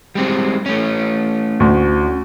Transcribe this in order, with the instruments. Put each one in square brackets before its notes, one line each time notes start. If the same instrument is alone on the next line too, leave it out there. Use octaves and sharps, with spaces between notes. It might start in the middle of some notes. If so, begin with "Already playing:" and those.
[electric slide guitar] G3 G#3 C4
A3 C#4
[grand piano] D2